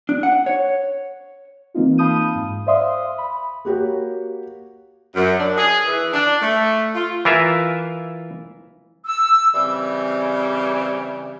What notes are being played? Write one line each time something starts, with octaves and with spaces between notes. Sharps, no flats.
D4
F#5
C#5
E3 A#3 C4 D#4 F4
F5 A5 B5 D#6 G6 D#7
G#2
C5 D5 E5 F5 C6 D#6
B5
A#3 F#4 G4 C#5
F#2
D4
G#4
E3
D4
A3
F4
E3 E4 F4 A#4 E5
E6
C#3 E3 G3 C4